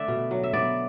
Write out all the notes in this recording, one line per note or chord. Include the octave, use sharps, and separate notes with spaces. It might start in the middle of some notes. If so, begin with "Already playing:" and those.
Already playing: D3 A3 D5 E5
B2
F#3
E5
B3 D5